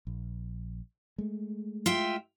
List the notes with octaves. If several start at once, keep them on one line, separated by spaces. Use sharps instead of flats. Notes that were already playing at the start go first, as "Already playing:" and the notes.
A#1
G#3 A3
F4 E5 G5